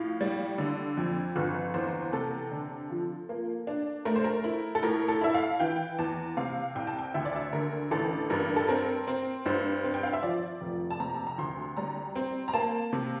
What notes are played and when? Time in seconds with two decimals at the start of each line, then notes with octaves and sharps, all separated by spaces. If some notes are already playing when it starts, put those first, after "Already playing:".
Already playing: A2 F3 F5
0.21 G3
0.58 D3
0.97 F2
1.36 G1
1.74 E2 C5
2.13 C3 A4
2.51 D3
2.90 F3
3.29 A#3
3.67 D4
4.05 A3 A#4
4.16 C5
4.24 A#4
4.44 E4
4.75 A4
4.83 A2 A#4
5.08 A4
5.21 E4 E5
5.34 F5
5.60 E3 G5
5.98 E2 A5
6.37 C3 F5
6.75 C2 G5
6.87 A5
6.99 G5
7.14 D2 E5
7.25 D5
7.35 E5
7.53 D3 A#4
7.91 A1 A4
8.30 G2 A#4
8.56 A4
8.69 C4 A#4
9.07 C4
9.46 G2 C5
9.84 C4
9.94 G5
10.03 F5
10.13 E5
10.23 F3 D5
10.61 F1
10.90 A5
11.00 C3 A#5
11.14 A5
11.27 A#5
11.38 D2 C6
11.77 G3 A#5
12.16 C4
12.48 A#5
12.54 A#3 A5
12.93 C3